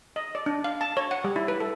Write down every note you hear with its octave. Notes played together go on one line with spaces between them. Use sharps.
D#5
D5
D4
F5
A5
C#5
F#5
G3
E4
B4
A4